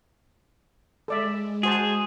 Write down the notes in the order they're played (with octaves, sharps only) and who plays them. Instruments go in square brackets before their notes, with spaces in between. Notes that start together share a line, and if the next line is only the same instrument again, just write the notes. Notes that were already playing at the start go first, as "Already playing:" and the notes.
[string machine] G#3 [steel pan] A4 D5 E5
[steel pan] F#4 C5 A5 [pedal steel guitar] G#4